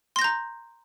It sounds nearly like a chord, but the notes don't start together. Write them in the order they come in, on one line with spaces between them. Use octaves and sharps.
C6 A#6 G6 A#5